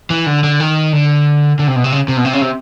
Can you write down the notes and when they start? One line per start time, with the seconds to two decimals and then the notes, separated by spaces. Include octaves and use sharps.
0.10 E3
0.26 D3
0.44 D3
0.60 D#3
0.93 D3
1.59 D3
1.68 C3
1.76 B2
1.84 C3
1.92 C#3
2.08 C3
2.17 B2
2.25 C3
2.33 C#3
2.41 C3